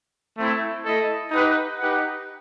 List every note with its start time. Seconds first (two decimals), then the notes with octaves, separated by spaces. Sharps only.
0.36 A3 C4 E4
0.84 A3 E4 A4 D#5
1.31 D#4 G4 B4 F#5
1.79 D#4 G4 B4 F#5